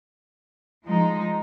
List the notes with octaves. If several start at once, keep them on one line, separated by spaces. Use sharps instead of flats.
F3 G#3 D#4